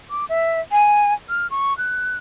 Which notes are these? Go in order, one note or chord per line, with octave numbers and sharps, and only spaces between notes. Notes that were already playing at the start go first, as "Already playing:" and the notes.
D6
E5
G#5
F6
C#6
F#6